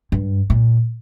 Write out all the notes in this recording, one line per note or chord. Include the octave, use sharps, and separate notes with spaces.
G2
A#2